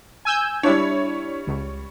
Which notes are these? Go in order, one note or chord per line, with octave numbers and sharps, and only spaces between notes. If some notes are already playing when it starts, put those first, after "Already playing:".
G#5 E6 G6
G3 D4 E4 C#5
C#2